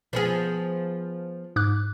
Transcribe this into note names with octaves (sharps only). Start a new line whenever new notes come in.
F3 B3 G#4
G#2 D6 F#6